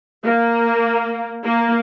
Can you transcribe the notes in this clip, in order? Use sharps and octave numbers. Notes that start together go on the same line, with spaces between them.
A#3
A#3